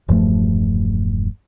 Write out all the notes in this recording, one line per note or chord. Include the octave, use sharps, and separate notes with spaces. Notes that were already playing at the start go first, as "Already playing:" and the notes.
E1 G2 F3 A3